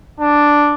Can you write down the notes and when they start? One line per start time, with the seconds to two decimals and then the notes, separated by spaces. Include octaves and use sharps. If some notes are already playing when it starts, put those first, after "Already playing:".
0.20 D4